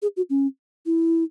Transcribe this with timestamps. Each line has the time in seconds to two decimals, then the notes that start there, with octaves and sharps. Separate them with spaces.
0.02 G#4
0.17 F#4
0.30 C#4
0.86 E4